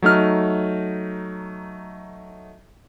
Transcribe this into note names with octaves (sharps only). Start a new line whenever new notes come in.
F#3 A3 D#4 F6